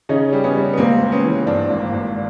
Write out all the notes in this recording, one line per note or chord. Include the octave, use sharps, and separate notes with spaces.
C#3 C#4 D#4
G3
B3 C#4
G3
B3
C#2 A#3 C4
C#2
B3 C#4
E3
G2 C4 D4
G#1
A#3
G#1